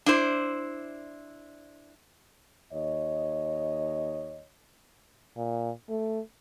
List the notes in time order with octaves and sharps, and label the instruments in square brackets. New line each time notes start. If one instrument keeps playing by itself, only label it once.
[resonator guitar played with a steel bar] D4 E4 C5
[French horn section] D#2 C#5 D#5
[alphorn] A#2
A3